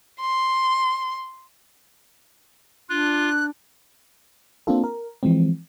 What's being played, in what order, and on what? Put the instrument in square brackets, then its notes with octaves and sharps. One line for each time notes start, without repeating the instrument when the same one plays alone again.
[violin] C6
[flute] D4 [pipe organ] F4 [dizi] F#6
[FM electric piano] A#3 C4 D4 F4 A4
A#4
E3 F3 G#3 C4